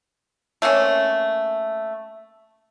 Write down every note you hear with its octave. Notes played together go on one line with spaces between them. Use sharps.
A3 A#3 C4 C#4